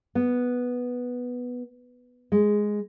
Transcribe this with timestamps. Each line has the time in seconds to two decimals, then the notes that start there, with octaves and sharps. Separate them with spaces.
0.15 B3
2.32 G#3